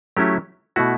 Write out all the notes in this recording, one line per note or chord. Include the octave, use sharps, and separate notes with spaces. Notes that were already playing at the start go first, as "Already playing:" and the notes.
F#3 A3 C#4 E4 G4
B2 A3 E4 F#4